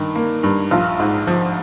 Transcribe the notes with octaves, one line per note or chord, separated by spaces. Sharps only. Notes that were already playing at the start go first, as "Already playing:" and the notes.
Already playing: G2 D#3
A#3
G2
A#1 F4
G#2
F3